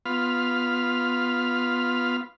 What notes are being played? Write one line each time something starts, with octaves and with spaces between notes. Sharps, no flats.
B3 F4 F5 B5 C6 F6